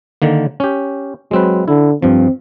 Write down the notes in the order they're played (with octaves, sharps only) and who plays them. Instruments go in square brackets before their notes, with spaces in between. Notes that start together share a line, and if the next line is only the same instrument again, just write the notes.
[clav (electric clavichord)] D3 D#3 A#3
C#4 G4
[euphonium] F#3 [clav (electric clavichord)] G#3 C4 B4
[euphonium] D3 [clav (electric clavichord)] E4
[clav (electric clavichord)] G2 F3 [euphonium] C4